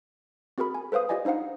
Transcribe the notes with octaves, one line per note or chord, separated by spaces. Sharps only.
C4 F#4 G#4 A#4 B5
G#5
A4 B4 C5 F5 D#6
F4 G4 D5 D#5 G#5
D4 D#4 C5 F5 F#5